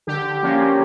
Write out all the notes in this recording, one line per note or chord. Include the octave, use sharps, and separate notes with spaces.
D3 G4
F3 A#3 C#4